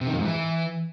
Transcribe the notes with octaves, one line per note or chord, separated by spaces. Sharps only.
C3
D#3
F2
G#2
E3